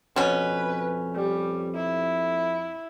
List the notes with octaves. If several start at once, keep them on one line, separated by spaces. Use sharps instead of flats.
F2 B2 C#4 B4
G3
E4